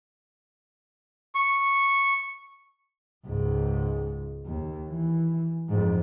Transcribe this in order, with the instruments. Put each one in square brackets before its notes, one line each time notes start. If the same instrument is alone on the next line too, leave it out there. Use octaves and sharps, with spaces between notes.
[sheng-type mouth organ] C#6
[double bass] C#2 G#2
D#2
E3
F2 G#2